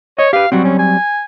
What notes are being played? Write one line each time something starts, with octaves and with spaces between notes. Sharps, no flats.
C#5 D#5
G4 B4 F5
F#3 G3 C4 F#4
C#4
G#5